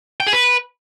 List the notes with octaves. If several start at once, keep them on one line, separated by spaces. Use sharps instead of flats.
G5
G#4
B4